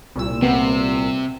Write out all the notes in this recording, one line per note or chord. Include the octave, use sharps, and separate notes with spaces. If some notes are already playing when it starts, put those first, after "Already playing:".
C2 A#2 E6
C3 B3